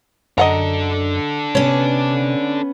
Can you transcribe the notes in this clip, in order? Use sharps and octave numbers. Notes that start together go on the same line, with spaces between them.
F#2 D4 A4 D#5 F#5 A#5
C3 B3 C#4 C#5